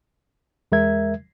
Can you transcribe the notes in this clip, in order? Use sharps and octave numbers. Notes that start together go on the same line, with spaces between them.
E2 G#3 A#4 E5 G#6